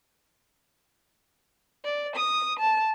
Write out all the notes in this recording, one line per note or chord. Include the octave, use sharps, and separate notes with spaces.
D5
D#6
A5